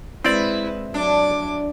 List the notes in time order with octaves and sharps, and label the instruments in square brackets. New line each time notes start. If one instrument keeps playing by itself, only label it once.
[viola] G#3 B4 [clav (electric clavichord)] C4 D5 [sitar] E4
[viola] F#3 D6 [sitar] D4